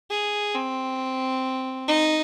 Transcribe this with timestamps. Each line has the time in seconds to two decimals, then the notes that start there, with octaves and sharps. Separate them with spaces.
0.11 G#4
0.55 C4
1.88 D#4